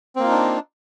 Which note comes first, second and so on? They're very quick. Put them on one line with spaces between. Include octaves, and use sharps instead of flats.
C4 A#3 F4 D#4 D4